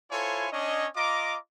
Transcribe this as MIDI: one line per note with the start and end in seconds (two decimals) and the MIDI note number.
0.11 0.47 64
0.11 0.47 65
0.11 0.47 69
0.11 0.47 72
0.11 0.47 73
0.11 0.47 80
0.52 0.87 61
0.52 0.87 62
0.52 0.87 73
0.52 0.87 75
0.96 1.36 65
0.96 1.36 75
0.96 1.36 82
0.96 1.36 86